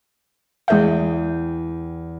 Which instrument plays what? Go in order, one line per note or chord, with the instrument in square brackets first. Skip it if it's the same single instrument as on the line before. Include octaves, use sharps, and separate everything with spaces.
[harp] E2 G5 [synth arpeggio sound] G#3 G#4 E5